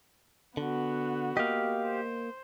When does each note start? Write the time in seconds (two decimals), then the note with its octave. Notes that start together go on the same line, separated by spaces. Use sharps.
0.57 D3 B3 F#4
1.37 A#3 G4 D#5 F5
1.85 C5